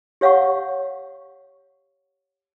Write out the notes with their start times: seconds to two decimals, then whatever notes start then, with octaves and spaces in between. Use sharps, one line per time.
0.21 G4 C#5 F5 F#5 C#6